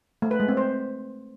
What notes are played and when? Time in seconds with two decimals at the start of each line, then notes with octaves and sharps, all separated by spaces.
0.22 A3
0.31 B4
0.40 G#3
0.48 C4
0.57 C5